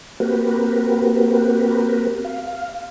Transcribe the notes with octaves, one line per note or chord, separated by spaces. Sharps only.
A#3 C4 F#4 G4 A#4 B4
F5